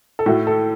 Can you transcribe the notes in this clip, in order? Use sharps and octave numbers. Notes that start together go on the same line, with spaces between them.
A4
A2 A3 F#4
A4